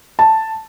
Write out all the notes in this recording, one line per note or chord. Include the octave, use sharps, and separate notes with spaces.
A5